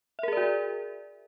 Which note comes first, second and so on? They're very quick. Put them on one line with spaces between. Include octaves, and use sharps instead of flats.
E5 A#4 G#4 D5 F#4